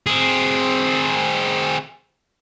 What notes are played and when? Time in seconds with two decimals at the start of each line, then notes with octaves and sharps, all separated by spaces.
0.07 C4 G#4